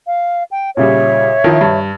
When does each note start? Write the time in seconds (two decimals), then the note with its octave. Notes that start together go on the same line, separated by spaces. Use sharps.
0.07 F5
0.50 G5
0.77 A#2 C#3 G3 C#5 E5
1.44 D#3 F3 E4
1.61 G2